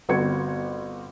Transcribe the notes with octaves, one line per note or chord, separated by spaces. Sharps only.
G1 B3 C4 F#4 G#6 C#7